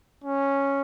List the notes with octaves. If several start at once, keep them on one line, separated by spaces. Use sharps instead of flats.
C#4